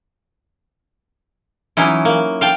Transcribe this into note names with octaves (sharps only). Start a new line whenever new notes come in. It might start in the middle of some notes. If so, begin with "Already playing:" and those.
E3 F#3 C#4 D#4 E4
A#3
F5 G5 A5